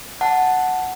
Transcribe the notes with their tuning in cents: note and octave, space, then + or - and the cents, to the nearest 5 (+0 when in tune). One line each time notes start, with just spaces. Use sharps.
F#5 +0 A5 +0